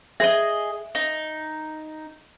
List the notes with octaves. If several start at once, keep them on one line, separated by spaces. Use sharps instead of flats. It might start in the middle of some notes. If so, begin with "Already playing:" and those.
G#4 C5 D#5 E5
D#4